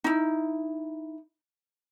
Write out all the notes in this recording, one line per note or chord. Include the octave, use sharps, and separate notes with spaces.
D#4 E4